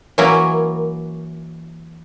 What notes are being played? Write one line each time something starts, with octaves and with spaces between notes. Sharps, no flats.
E3 F#3 A#3 C#4 E4 A#4